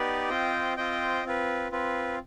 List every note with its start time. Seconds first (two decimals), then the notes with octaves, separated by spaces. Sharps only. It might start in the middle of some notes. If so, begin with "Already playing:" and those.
Already playing: B3 D#4 G4 B4 D5
0.28 C4 F4 C5 D#5 G5
0.77 C4 F4 C5 D#5 G5
1.24 C4 F4 B4
1.72 C4 F4 B4